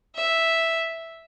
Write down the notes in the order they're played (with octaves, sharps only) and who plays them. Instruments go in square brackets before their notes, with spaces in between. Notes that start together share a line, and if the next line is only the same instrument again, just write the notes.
[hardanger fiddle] E5